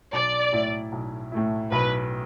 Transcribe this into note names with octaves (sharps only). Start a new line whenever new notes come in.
B1 D5
A2 A3 E4
B1
A2 A3 E4
B1 B4